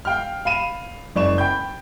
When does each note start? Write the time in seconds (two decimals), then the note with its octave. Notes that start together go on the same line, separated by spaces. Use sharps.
0.05 F5 G5 F6
0.45 F5 B5 D#7 E7
1.16 F#1 D5 C#6 E7
1.38 G5 B5 G6